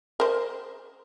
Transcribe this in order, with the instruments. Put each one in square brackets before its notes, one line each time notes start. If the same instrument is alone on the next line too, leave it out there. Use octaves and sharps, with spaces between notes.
[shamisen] A#4 C5